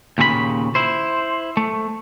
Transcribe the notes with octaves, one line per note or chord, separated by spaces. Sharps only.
D#2 A#2 C#3 G#4 B5
E4 C5
A3